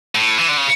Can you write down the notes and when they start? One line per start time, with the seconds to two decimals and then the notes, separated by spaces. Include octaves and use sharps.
0.15 A2
0.38 E3
0.48 D3
0.58 C#3